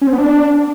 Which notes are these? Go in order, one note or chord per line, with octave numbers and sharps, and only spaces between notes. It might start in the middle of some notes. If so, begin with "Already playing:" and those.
C#4
C4
B3
D4